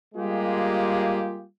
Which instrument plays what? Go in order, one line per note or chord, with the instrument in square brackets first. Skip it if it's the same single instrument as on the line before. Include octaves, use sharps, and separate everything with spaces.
[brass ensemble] G3 G#3 A#3 F4 G4 G#4